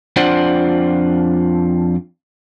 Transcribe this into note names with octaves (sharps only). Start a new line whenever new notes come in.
F2 D4 F4 C5 D5 F#5